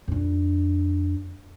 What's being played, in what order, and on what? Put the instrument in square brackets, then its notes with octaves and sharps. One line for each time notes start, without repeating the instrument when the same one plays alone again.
[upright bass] F2 D4